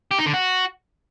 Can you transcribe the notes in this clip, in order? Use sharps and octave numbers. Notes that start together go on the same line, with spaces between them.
G4
D#4
D3
F#4